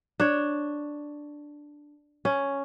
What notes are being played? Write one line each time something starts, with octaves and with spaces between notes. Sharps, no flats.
D4 C#5
C#4